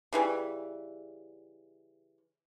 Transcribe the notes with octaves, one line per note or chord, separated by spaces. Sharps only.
C#3 E3 G3